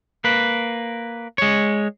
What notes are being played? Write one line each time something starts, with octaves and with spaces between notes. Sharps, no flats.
A#3 B4
G#3 C#5